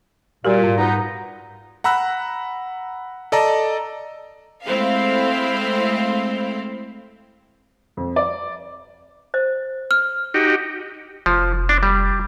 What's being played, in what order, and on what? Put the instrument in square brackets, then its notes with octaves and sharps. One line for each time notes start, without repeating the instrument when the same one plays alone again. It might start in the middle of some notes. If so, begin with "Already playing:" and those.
[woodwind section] A#2 [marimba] G3 F#4 G4
[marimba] G#2
[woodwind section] B3 D#4 [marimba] A#5
[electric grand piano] F#5 A#5 B5 E6 F#6
A4 D5 D#5 A5 A#5
[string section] G#3 A3 C4 E4 C5 F5
[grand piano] F2
D5
[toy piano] C5 D#5
[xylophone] F6
[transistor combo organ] D#4 F#4 G4
[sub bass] F1 [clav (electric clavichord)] F3
[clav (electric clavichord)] D4
G3